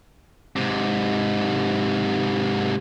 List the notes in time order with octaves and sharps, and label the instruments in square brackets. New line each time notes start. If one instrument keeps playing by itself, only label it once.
[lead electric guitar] G#2 C3